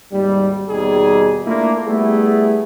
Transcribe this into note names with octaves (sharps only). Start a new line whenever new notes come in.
G#1 D#2 G3
D#2 B2 G3 D#4 G#4
A3 A#3 D4 E4 F4
G3 A3 B3 E4 G#4